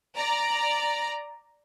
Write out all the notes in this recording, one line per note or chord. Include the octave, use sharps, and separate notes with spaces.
D5 A#5